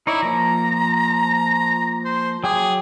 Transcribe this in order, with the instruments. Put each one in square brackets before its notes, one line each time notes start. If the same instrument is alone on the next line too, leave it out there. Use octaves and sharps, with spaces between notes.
[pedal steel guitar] D#4 C#5 D5 [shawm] E4
[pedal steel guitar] F3 A#3 [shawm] A#5
[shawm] C5
[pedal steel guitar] F#3 G5 D6 [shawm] G#4